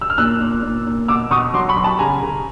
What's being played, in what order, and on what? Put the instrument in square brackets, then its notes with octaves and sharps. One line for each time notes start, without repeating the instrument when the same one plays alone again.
[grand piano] E6
F6
A#2 E6 F#6
A#2
A#2
A#2
B2 D6 E6
B2 C#6 D#6
F#3 C6 D6
B5 C#6
B2
A5 B5
C#3 G#5 A#5
C#3